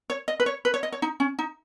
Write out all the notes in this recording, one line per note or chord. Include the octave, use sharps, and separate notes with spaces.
C#5
D#5
B4
C#5
B4
C#5
D#5
C#5
D#4
C#4
D#4